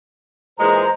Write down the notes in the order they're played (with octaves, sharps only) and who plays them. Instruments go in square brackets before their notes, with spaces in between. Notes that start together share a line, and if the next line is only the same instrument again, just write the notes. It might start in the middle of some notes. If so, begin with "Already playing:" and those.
[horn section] A#2 E3 G#3 [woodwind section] C5 A#5